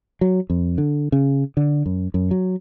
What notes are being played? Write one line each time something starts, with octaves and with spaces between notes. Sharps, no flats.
F#3
F2
D3
C#3
D3
F#2
F#2
F#3